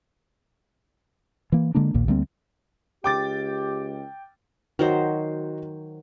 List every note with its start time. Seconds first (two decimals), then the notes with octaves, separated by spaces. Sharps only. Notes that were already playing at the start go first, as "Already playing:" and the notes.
1.52 E3 A#3
1.75 D3 G#3 A#3 D4
1.94 A#1 D#2 A#2
2.08 D2 G3 A#3 C4
3.04 C#2 G4 G5 D6 A6
4.79 D#3 F#3 F#4 C5 D#5